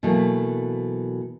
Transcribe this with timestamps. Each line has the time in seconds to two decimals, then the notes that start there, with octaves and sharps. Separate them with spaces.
0.03 B2 E3 F#3 A3 A#3